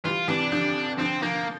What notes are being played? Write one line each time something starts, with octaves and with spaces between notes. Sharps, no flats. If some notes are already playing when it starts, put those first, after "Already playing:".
E3 G3 F4
C3 E3 D4
D3 F3
D3 F3 C4
D3 F3 A#3